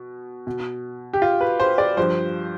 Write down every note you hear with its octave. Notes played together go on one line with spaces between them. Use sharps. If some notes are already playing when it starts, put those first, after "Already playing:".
Already playing: B2
B2
G4
F4
B4
C5
D5
G2 F3 C5